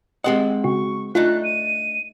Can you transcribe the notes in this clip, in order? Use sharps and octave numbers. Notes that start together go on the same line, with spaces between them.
G#3 C4 G4 D#5 F#5
C#3 F#4 C#6
A3 D4 D#4 F4 F#6
D#7